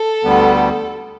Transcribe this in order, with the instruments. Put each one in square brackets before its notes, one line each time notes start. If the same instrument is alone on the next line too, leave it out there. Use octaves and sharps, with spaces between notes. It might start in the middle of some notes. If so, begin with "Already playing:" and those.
Already playing: [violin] A4
[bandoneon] D2 D3 G3 B3